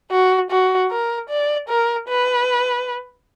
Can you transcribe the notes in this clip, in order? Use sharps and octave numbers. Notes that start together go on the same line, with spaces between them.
F#4
F#4
A#4
D5
A#4
B4